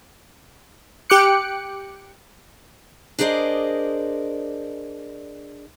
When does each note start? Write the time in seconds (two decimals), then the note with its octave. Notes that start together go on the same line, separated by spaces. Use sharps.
1.10 G4 G5 D6 F#6 C#7
3.19 D4 G#4 A#4 C5 D5 D#5